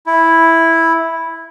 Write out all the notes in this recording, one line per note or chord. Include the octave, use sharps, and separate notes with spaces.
E4